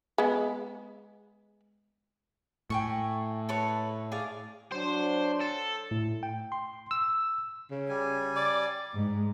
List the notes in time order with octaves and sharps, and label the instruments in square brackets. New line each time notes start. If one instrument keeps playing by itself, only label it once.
[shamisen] G#3 B3
[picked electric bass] A2 [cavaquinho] G5 G#5 C#6
[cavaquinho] A4 B4 C#5
G#4 D5 F5
[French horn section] F#3 D4 [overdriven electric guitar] C5
[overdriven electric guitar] A4
[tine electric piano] A2
G5
C6
E6
[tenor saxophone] C#3
[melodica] G3 G#5
[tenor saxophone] D5
[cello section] G#2